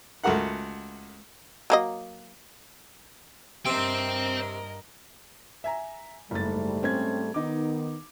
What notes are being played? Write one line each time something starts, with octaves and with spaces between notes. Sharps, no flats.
C#2 A3 F#4 A#4 F#5
F#3 A#3 D#5
G2 C3 C4 A#4 C5 D#5 G5
E5 G#5 A#5
F#1 G#2 G3 A3 A6
C4 C#4 G#6
D#3 B3 D#4 D6